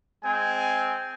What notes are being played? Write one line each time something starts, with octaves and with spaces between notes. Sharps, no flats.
G#3 C4 G#5